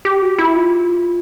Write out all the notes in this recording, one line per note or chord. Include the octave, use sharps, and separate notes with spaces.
G4
F#4
E4
F4